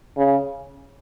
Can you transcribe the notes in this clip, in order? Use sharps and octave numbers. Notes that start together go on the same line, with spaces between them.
C#3